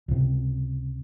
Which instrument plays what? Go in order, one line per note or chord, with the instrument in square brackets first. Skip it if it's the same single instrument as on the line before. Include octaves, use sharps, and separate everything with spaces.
[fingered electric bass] C#2 C3